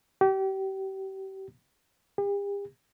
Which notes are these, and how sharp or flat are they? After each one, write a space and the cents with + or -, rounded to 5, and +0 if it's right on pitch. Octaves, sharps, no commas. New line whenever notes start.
G4 -30
G4 +45